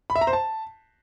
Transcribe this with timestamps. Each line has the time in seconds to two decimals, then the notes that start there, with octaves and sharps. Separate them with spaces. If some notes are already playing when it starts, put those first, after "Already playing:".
0.10 B5
0.16 E5
0.21 A#5
0.27 C5
0.33 A5